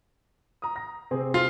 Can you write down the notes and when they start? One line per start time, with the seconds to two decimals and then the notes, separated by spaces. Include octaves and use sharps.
0.62 A#5 D#6
0.76 A#5 A#6
1.11 C3 C4 G#4
1.34 F4